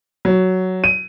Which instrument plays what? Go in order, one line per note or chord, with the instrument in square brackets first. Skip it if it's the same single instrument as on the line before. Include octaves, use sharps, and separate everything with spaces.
[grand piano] F#3
D#7